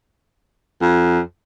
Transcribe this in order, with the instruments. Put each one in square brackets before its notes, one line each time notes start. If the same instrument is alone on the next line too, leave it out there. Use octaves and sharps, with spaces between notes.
[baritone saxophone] F2